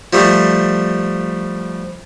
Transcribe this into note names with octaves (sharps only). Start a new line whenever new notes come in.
F3 G3 A3